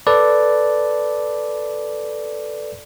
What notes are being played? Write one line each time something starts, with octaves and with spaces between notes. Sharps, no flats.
A4 B4 D5